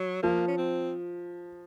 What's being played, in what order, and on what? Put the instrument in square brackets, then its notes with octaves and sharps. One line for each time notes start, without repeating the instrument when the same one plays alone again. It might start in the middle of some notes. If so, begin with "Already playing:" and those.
Already playing: [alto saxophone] F#3
[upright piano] F3 [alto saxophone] A#3
[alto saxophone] C#4
C4